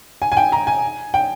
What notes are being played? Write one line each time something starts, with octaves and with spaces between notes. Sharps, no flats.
G#5
G#5
G5
A#5
G#5
G5